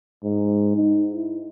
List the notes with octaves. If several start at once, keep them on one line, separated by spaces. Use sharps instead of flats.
G#2
D#4
E4